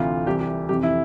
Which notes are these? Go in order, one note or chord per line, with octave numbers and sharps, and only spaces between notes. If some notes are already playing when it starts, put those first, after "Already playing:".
Already playing: D2 C3 E3 F4
C2 C3 E3 G4
G4
F2 C3 E3 G4
E4